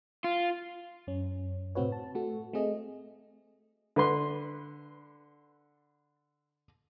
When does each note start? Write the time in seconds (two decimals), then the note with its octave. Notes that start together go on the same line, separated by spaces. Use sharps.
0.24 F4
1.07 F#2 C#4
1.75 A2 C3 C4 F#4 B4 C#5
1.92 A5
2.15 A3 F#4 A4
2.53 A3 C4 G#4 D#5
3.96 D3 B4 C6